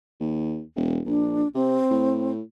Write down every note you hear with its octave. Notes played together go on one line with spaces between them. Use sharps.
D#2
E1
A#1 D4
C3 C4
A2